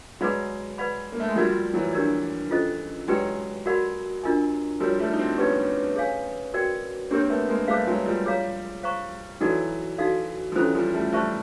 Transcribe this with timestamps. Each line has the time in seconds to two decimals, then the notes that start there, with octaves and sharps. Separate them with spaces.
0.21 F#3 G#3 G#4 B4 D5 F#5 B5
0.78 B4 D5 F#5 B5
1.12 A#3
1.20 A3
1.28 G#3
1.36 F3 G3 F#4 A#4 D5 F#5 B5
1.74 E3 F#3
1.93 D4 G4 A#4 D5
2.51 C#4 F4 A4 C5 D#5
3.08 F#3 G#3 G4 B4 D5 G5
3.66 F#4 A#4 D5 F#5 B5
4.23 D4 F4 A#4 D#5 G#5
4.80 F3 G3 F#4 A#4 C#5
4.99 G3 A3
5.13 D#4
5.19 C4 D4
5.38 B3 C#4 G4 B4 D5
5.96 G#4 C#5 F5 G#5
6.54 F#4 A#4 D5 G5
7.11 A#3 C4 D4 G4 A#4 C#5
7.30 A3 B3
7.49 G#3 A#3
7.68 G3 A3 G#4 C5 F5
7.87 F#3 G#3
8.06 F3 G3
8.26 G#4 C#5 F5 A#5
8.83 C5 F5 A#5 C#6
9.41 E3 F#3 D#4 F#4 A4 D5
9.98 D#4 F#4 A4 D5 F5
10.52 F3
10.56 E3 F#3 C#4 F4 A4 C5
10.75 F3 G3
10.94 G3 A3
11.13 G3 A3 C5 E5 A5 C#6